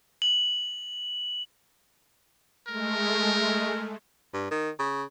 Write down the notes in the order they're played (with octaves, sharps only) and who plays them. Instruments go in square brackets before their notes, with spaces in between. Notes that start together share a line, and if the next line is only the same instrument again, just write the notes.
[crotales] F#7
[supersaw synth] G#3 A3 [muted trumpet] A#4
[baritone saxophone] G2
D#3
C#3